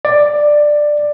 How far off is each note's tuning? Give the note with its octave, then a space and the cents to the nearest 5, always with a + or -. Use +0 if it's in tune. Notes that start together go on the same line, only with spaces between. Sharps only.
D5 +10